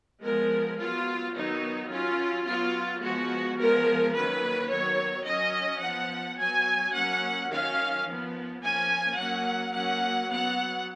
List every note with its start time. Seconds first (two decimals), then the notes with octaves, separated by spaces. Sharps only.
0.23 F3 G#3 B3 A#4
0.79 F#3 B3 F4
1.34 D#3 F#3 B3 D#4
1.91 F#3 C#4 F4
2.46 F#3 B3 F4
3.02 F3 G#3 B3 F#4
3.59 F3 G#3 B3 A#4
4.14 D#3 F#3 A#3 C#4 B4
4.70 D#3 F#3 B3 C#5
5.27 F#3 C#4 D#5
5.82 F3 B3 F#5
6.38 F#3 B3 G#5
6.94 F#3 A#3 C#4 F#5
7.50 D#3 F#3 C#4 F5
8.07 F3 B3
8.63 F3 A#3 C#4 G#5
9.18 F#3 A#3 C#4 F#5
9.74 F#3 A#3 C#4 F#5
10.30 F#3 B3 F#5